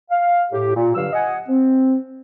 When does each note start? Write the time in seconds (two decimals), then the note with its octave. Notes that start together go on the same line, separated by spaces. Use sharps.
0.11 F5
0.52 A2 G4
0.75 A#2
0.95 G2 D3 F#3 F5 E6
1.12 D#5 F#5 G#5
1.48 C4